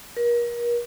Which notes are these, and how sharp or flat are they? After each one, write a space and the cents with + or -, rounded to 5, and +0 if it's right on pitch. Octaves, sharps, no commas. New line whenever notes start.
A#4 +35